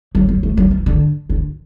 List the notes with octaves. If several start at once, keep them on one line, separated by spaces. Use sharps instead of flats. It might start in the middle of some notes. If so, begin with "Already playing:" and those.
F#3
F#3
A3
F#3
E3
D3
D3